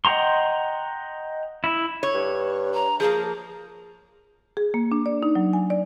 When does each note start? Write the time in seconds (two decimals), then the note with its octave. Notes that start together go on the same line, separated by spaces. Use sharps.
0.05 D#5 F#5 G5 A#5 C6
1.64 E4
2.03 C#5
2.14 G2
2.74 A#5
3.00 F3 A#3 G#4
4.57 G#4
4.74 A#3
4.92 D4
5.06 D5
5.23 D#4
5.35 F#3
5.53 G#5
5.70 D5